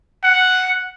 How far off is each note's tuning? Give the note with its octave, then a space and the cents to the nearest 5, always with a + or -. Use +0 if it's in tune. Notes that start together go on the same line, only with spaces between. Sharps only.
F#5 +0